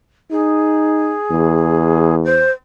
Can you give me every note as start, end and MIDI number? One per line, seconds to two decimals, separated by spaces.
0.31 1.16 63
0.31 2.15 68
1.31 2.48 40
2.25 2.50 72